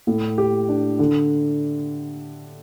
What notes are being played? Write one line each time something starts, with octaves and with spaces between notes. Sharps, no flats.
A2
G4
D4
D3